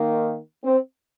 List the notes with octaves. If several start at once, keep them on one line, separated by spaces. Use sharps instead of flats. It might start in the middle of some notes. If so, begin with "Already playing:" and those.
Already playing: D#3 A#3
C4